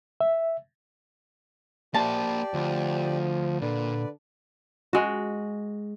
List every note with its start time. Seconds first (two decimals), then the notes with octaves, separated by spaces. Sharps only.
0.21 E5
1.94 A#3 G4 C5 D5 A5
2.54 D2 F3
3.62 A#2 D3 B4 D5
4.93 G#3 F#4